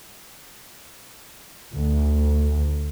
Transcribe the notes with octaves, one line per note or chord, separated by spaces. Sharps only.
D2